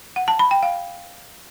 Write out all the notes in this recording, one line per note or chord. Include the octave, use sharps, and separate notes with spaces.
F#5
A5
B5
G5
F5